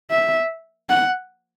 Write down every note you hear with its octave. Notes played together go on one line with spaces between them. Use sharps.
E5
F#5